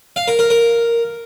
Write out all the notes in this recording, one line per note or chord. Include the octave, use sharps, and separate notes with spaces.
F5
A#4
A#4
A#4